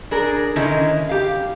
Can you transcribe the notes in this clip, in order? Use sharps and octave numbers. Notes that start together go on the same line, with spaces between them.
D4 G#4 A#4
D3 D#3 C#4 D#4 E4
G4 F5